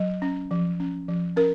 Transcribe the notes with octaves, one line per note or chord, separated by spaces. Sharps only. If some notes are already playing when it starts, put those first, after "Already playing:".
Already playing: F#3
C#4
F3
C#4
F3
C#4 A#4